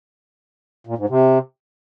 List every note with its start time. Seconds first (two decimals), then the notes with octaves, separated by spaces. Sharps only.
0.87 A#2
0.98 G#2
1.09 C3